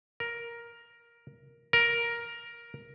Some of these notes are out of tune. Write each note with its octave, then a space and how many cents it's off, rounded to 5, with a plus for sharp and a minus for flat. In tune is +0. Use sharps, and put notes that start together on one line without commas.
A#4 +10
A#4 +10